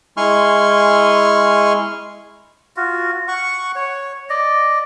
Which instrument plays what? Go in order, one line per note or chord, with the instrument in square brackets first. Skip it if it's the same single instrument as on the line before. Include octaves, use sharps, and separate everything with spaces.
[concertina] G#3 E4 G#5 C6 C#6 F6
[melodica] F4 F#4
F#5 C#6
C#5
D5 D#5